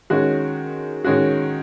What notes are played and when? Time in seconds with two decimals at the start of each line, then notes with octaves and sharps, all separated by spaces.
0.10 D#3 G#3 C#4 F#4
1.04 D#3 G#3 C#4 F#4